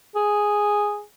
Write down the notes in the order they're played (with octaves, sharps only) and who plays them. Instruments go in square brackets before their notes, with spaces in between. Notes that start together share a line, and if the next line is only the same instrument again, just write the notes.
[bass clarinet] G#4